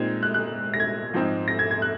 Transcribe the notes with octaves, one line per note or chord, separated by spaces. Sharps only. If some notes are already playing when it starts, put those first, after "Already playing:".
Already playing: A#2 G#3 C4 D#4 G#6
F#6
F#6
A#6
G#6
G#2 F3 C4 D#4
A#6
G#6
G#6
F#6